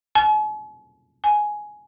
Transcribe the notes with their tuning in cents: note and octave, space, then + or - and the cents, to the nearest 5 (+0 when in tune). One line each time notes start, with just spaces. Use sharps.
G#5 +45
G#5 +10